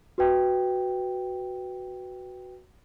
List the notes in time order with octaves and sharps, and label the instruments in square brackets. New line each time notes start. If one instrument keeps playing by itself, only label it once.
[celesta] F#4 B4 G5